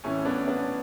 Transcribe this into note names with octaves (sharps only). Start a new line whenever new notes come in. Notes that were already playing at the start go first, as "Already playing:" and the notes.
A2 E3 A3 C#4
B3 D4
B3 D4